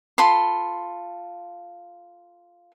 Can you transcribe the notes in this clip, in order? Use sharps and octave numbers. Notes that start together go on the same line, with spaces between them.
F4 A4 B5 C6